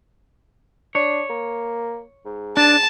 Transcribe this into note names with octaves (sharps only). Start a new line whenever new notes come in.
D4 C#5
A#3
G#2
D4 A5